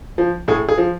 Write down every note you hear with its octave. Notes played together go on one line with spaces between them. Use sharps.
F3
A2 G#4
G#4
F3